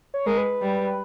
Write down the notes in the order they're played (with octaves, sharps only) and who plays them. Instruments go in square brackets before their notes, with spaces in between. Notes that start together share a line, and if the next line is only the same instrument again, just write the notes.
[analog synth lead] C#5
[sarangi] G#3 [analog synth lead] A#4
[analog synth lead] B4
[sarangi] G3